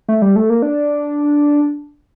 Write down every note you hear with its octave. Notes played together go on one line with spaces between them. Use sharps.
A3
G3
A3
A#3
D4